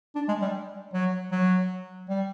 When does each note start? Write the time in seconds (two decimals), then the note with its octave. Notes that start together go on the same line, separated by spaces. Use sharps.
0.15 D4
0.28 G#3
0.41 G3
0.93 F#3
1.32 F#3
2.09 G3